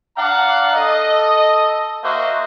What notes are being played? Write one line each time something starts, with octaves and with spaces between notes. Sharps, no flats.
D4 D5 F5 F#5 A#5
A4 D#5
A#3 F#4 C5 D#5 E5